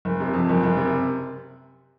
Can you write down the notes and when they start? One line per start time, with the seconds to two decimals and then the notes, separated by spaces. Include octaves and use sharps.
0.05 F#1
0.20 C3
0.34 F2
0.49 F#1
0.63 F#1
0.77 C3